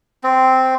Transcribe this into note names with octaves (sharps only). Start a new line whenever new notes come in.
C4